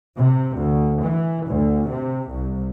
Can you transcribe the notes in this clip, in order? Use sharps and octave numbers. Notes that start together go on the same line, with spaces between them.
C3
D2
E3
D2
C3
C2